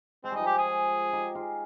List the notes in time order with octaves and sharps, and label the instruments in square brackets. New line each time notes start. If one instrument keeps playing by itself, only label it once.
[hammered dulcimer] G#3 [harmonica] C4
[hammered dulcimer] G3 [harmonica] D#4
[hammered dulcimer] F3 G#3
[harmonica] G4
G#4
[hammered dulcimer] D#4 G4
F4 G#4